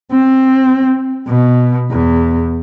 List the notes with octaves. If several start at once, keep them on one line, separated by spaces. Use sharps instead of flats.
C4
B2
E2